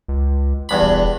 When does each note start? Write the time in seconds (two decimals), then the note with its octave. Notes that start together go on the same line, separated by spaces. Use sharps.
0.08 C#2
0.69 E2 G2 B5
0.82 E1